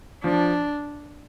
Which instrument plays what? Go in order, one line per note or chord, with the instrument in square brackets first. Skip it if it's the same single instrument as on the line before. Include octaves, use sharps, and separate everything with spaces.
[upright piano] F3 [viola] D4